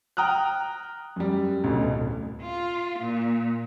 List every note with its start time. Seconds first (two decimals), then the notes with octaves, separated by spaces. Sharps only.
0.17 G5 A#5 D#6 F6 F#6
1.16 F#2 G3
1.64 A1 D2 B2
1.83 D1
2.42 F4
2.99 A#2